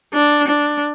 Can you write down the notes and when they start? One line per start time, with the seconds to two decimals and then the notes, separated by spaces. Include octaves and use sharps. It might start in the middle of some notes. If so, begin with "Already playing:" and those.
0.14 D4
0.48 D4